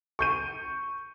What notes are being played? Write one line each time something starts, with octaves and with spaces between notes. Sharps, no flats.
C#6 G6 D#7